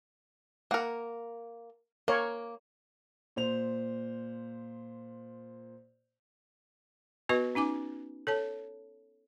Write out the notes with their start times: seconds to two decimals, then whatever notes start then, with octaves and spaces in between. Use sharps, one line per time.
0.71 A#3 A#4 F#5
2.08 A#3 A#4 C#5
3.36 A#2 C5 F7
7.29 B3 F#4 B4 D#5 C#6
7.55 C#4 D#4 G#5 D6
8.27 A4 C#5 A5